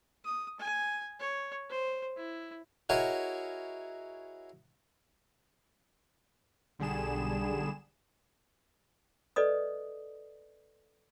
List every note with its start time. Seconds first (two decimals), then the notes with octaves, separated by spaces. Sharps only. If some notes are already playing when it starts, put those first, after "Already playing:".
0.25 D#6
0.60 G#5
1.19 C#5
1.70 C5
2.16 E4
2.89 E4 F#4 G#4 A#4 C#5 D#5
6.79 B1 D3 G3 G#4 E7
9.36 A4 B4 D5 D#5 D#6